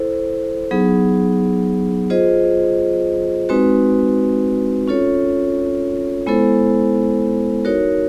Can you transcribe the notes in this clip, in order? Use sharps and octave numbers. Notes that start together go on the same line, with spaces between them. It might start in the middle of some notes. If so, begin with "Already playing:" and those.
Already playing: E4 A4 C5
F#3 B3 D#4 G#4
F4 G#4 C5 D#5
G#3 C4 D#4 F#4 B4
C#4 F4 A4 C#5
G#3 B3 E4 A4 C5
D#4 F#4 A#4 C#5